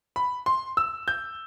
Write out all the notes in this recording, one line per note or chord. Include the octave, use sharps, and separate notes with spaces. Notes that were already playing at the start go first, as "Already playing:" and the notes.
B5
C6
E6
G6